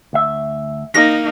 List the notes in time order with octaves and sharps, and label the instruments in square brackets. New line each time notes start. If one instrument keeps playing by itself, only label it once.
[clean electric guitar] D2 E5
[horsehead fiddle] A#3 D#4 [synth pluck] A#6